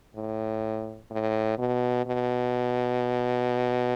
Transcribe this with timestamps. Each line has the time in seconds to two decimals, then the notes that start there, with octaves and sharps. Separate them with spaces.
0.16 A2
1.10 A2
1.58 B2
2.06 B2